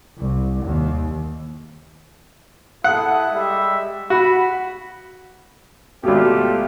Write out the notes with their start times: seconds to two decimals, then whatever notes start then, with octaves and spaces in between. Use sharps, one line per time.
0.18 C2
0.63 D#2
2.84 E4 A4 F#5 D#6
3.32 G3 G#3 E5
4.10 F#4 B5
6.03 G#1 B2 A3 F4 G4